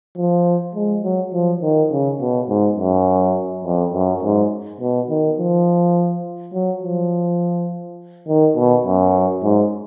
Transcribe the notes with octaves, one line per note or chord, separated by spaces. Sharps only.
F3
G#3
F#3
F3
D#3
C#3
B2
G#2
F#2
F2
F#2
G#2
B2
D#3
F3
F#3
F3
D#3
B2
F#2
G#2